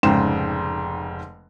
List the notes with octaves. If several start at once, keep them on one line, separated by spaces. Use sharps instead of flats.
F1 G#2 C#3 G5 C6 E7